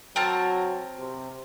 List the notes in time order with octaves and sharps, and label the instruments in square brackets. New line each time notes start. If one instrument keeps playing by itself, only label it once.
[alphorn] F#3 [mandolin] C4 A#4 A5
[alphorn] C3